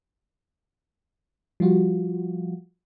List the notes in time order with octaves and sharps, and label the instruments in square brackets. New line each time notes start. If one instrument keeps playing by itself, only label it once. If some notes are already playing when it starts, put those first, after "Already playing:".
[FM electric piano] F3 G3 F4 F#4